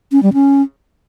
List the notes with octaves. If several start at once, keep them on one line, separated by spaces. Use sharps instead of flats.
C#4
G3
C#4